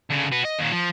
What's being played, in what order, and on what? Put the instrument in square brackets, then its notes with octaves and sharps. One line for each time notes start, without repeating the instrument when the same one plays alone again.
[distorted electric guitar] D2 C#3
F#4 B4
D#5
D#2 A#2
F3